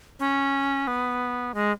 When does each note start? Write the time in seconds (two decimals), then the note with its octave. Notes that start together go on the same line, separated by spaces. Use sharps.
0.19 C#4
0.87 B3
1.54 G#3